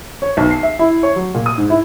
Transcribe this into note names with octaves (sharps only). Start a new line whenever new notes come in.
C#5
B1
C7
E5
E4
C#5
F#3
A#2
D#6
G#2
E4